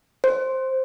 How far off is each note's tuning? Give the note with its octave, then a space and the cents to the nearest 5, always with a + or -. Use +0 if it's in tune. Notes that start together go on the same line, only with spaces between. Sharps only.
C5 +5